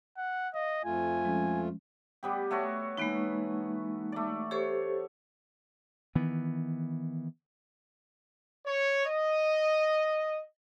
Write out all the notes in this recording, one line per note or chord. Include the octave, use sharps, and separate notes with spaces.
F#5
D#5 F5
F2 A3 F4 G#5
F3 G#3 C#4
G3 B3 G4
A3 F#4 C#5
E3 G#3 A#3 D#4 B4
A3 D5
G4 A4 C5 C#5
D#3 E3 B3
C#5
D#5